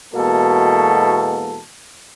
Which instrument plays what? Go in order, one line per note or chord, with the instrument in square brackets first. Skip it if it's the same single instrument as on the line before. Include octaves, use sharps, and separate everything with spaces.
[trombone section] E2 B2 G#3 A#3 F#4 A4